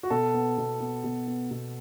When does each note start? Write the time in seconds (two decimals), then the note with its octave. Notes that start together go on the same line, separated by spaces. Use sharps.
0.03 F#4
0.10 B2 A4
0.34 B3
0.58 B2
0.80 B3
1.04 B2
1.27 B3
1.51 B2